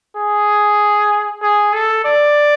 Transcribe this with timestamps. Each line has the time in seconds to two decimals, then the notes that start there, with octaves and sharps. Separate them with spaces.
0.17 G#4
1.42 G#4
1.73 A4
2.05 D5